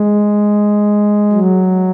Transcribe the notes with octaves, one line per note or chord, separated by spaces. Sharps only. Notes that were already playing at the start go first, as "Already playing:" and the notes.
Already playing: G#3
F#3